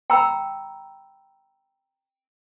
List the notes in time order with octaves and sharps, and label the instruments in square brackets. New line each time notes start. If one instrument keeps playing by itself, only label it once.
[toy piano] G5 A#5 B5 E6